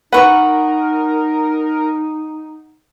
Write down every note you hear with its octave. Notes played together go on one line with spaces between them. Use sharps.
D#4 A#4 B4 F#5 C#6